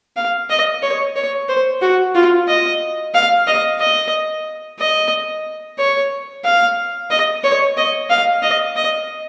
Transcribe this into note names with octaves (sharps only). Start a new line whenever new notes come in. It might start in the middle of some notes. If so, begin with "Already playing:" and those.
F5
D#5
C#5
C#5
C5
F#4
F4
D#5
F5
D#5
D#5
D#5
C#5
F5
D#5
C#5
D#5
F5
D#5
D#5